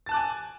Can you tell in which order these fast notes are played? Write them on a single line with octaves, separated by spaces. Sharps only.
A6 A5 F#6 D6 G#5